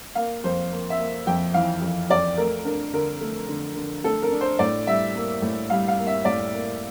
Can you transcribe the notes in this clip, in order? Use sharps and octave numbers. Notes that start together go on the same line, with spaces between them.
A#3 F5
F2 C5
A#3
E5
A#3
F2 G5
E3 F5
F2
F2 D5
A3 A#4
D4 A#4
D3 A#4
A3
D3
D3
A3 A4
A#4
D4
C5
A2 D5
G3 E5
A#3
A2
G3 F5
F5
A#3
E5
A2 D5
A#3